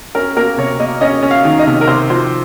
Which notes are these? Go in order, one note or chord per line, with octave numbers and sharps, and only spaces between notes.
C#4 A#4
A#3 A#4
C3 C#5
A#3 D#5
C#4 D#5
C#4
F5
D#3
D#5
C3
A#4
C3 C5
F3 C5